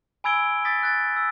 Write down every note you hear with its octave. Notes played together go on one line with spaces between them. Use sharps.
G#5 B5 E6 G#6 D7 G7
D#6 A6 B6
F#6 A6
E6